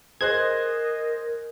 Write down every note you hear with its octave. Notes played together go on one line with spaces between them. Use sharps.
G#4 A#4 C5 D#5 F#6 G#6